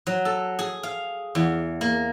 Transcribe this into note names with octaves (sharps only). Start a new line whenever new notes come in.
F#3
A4
G#4
F5
E2
A#3